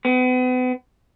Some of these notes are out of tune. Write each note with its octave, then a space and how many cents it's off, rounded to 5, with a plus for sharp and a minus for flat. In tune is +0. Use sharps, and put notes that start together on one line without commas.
B3 +40